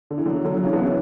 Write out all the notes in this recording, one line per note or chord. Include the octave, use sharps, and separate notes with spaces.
D3
E3
D3 F#3
D3 F#3
F#3
C#3 E3
B3 D4
C#4 E4